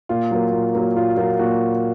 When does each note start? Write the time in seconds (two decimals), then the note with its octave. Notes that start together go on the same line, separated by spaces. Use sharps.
0.09 A#2 F4
0.31 F#3 A#3
0.53 A#2
0.75 F#3 A#3
0.96 A#2 F4
1.17 F#3 A#3 F4
1.39 A#2 F#4